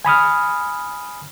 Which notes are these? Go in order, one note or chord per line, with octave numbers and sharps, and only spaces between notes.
G#5 B5 D#6 F6